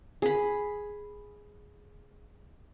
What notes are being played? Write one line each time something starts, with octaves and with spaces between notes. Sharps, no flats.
G#4 B5